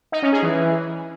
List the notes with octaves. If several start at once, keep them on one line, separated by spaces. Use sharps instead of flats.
D#4
C#4
G#4
E3